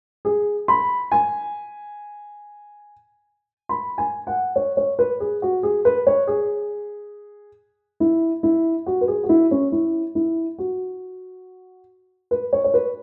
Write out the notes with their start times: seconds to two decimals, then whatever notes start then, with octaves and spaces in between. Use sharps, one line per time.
0.25 G#4
0.68 B5
1.12 G#5
3.69 B5
3.98 G#5
4.27 F#5
4.56 C#5
4.77 C#5
4.99 B4
5.20 G#4
5.42 F#4
5.63 G#4
5.85 B4
6.07 C#5
6.27 G#4
8.00 E4
8.43 E4
8.86 F#4
9.01 B4
9.08 G#4
9.24 F#4
9.29 E4
9.51 C#4
9.72 E4
10.15 E4
10.58 F#4
12.31 B4
12.53 C#5
12.64 C#5
12.74 B4